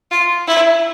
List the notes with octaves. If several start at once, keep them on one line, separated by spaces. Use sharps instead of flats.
F4
E4